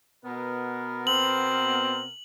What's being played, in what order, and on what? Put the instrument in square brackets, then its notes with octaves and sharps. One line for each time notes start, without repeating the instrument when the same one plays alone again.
[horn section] B2 B3 A#4
[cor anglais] C4 [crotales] F#7